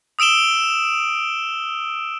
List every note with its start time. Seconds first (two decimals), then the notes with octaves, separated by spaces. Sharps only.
0.19 D#6 E6 D7 E7 G7